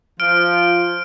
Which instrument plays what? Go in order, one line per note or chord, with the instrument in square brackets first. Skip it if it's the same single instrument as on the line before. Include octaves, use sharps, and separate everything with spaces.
[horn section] F3 [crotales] F6 D7